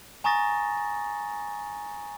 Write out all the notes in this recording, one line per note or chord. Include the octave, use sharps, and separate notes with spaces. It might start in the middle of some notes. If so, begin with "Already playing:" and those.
G#5 A#5 C#6 D#6 A6 A#6